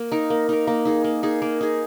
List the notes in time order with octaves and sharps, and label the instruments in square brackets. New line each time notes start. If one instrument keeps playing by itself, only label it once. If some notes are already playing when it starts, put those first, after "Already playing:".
Already playing: [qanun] A#3
D#4 A#4
A#3
D#4 A#4
A#3
D#4 G#4
A#3
D#4 G#4
A#3
D#4 G#4